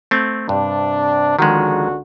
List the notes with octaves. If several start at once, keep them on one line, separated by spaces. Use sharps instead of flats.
A3 C4
G2 C3 D4
C#2 D3 D#3 F3 G#3 F#4